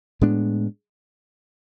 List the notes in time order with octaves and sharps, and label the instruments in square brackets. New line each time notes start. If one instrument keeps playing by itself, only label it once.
[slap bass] A2 G#3 B3 D4